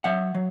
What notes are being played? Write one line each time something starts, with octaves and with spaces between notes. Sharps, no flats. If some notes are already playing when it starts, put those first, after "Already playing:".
F#3 E5 F#5
F#3